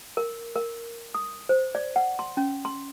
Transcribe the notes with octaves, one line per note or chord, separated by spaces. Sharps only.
A#4
A#4
D#6
C5
D5
F#5
C6
C#4
C6